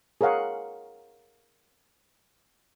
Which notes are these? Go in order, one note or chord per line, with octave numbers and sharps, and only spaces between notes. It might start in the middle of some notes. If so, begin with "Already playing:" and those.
G#4 A#4 C#5 F5 F#5